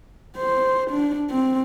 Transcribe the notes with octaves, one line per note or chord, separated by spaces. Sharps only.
C5
D4
C4